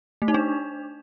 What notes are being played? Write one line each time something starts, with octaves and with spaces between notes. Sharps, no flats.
A3
D#4
D4